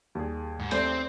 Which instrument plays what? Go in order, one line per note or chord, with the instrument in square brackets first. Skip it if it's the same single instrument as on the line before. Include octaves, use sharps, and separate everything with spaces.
[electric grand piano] D#2 G#4 [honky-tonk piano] G3
[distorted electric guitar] G#2
[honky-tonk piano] A1 A3 D5 [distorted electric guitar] C4 [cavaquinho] C5